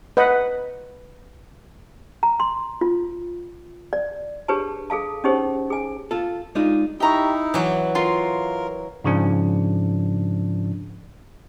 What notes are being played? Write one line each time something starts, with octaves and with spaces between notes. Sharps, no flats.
B4 D#5 F#5
A#5
C6
F4
D5
D4 G4 G#4 B4 C#5 A5
G#4 A4 F5 A5
C#4 D#4 G4 G#4 C5 C#5
G#4 G#5
F4 A4
G#3 D4 D#4 F4
D#4 E4 G4 A#5 C#6
E3 F#3 D6
F4 A#4 C6
G#2 C#3 F3 D4